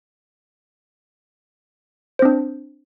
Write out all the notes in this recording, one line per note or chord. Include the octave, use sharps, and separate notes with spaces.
C4 D4 C5